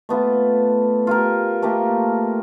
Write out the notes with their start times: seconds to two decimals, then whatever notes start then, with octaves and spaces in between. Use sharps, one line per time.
0.09 A3 B3 F4
1.07 F4 G4 A#4
1.62 A3 A#3 G4 A#4